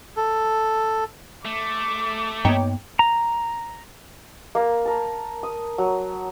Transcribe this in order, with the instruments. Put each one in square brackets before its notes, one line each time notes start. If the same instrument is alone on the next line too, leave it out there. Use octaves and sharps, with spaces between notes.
[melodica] A4
[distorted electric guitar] A3 [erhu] D6
[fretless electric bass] G2 A#3 B3 [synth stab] D#4 C#5 G5
[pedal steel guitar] A#5
[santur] A#3 A#4
A#4 A5
D#6
F#3